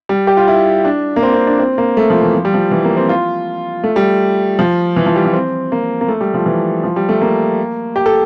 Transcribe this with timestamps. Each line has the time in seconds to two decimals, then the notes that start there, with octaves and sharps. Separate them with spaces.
0.09 G3
0.27 G4
0.37 F4
0.48 E4
0.85 D4
1.16 A#3
1.23 C4
1.34 C4
1.47 D4
1.59 C4
1.78 A#3
1.97 A3
2.10 F3
2.22 E3
2.34 F3
2.45 G3
2.54 F3
2.71 E3
2.84 A#3
2.97 C4
3.09 F4
3.84 A3
3.96 G3
4.59 F3
4.96 E3
5.06 F3
5.16 G3
5.25 F3
5.34 C4
5.72 A#3
6.01 A#3
6.08 A3
6.21 G3
6.34 F3
6.46 E3
6.84 F3
6.96 G3
7.09 A3
7.21 A#3
7.96 G4
8.06 A4